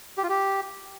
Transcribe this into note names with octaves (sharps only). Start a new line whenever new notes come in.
G4
F4
G4